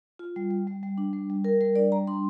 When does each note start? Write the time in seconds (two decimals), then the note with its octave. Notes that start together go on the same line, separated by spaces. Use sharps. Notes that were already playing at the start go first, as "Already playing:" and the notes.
0.19 F4
0.36 G3
0.51 G3
0.67 G3
0.83 G3
0.98 D4
1.13 G3
1.30 G3
1.44 G3 A#4
1.61 G3 A#4
1.76 D4 D5
1.92 G3 A#5
2.07 D4 C6